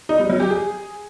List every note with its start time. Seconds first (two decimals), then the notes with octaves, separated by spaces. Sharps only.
0.09 D#4
0.19 G3
0.30 F#3
0.40 G4
0.50 G#4